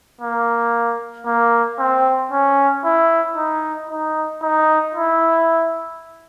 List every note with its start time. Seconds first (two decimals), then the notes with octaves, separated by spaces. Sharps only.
0.21 A#3
1.26 A#3
1.79 C4
2.31 C#4
2.85 E4
3.37 D#4
3.90 D#4
4.42 D#4
4.95 E4